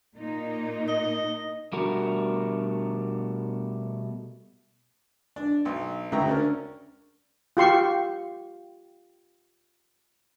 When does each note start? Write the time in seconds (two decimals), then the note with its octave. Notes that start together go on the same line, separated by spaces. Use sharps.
0.15 A#2 A#3 D#4
0.88 D#5
1.73 B2 G3 A3 D4 F#4 A#4
5.36 D4
5.65 B1
6.12 D2 C#3 E5 G5 A#5
6.27 C#4 D4 A#4
7.57 F4 G4 C6 C#6